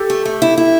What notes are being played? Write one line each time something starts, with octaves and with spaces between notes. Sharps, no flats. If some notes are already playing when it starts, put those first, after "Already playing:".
Already playing: G4 A4
A3
A3
E4
E4